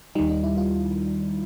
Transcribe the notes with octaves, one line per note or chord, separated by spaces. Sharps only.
D#2 D#3 G3 D#4
D#4
E4
F4